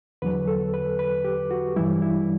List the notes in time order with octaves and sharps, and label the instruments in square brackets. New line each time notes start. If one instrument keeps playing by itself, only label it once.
[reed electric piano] E2 D3 F#3 B4
A4
B4
B4
G4
F#4
G2 E3 G3 E4
E4